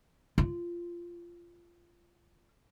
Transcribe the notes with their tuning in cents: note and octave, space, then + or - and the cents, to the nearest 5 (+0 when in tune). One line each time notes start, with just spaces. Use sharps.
F4 -15